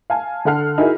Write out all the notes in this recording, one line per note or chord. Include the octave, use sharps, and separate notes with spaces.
F5 G#5 A5
D3 A4 F#5 A5 F6 C7
D#4 E4 F#4 G#4 A#4 E5